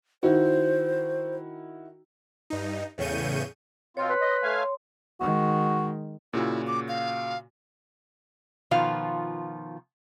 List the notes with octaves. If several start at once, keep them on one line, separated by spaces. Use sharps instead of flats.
D#3 E4 F#4 C5
G2 D#4
E2 A2 C#3 C#6 G6 D#7
B2 C4 F4 C#5 C6
B4
D#5
A3 F5 G#5
D#3 G#3 F#4
A#2 C#3 E4 F#4
D6
F5
B2 D#3 F3 F4 F5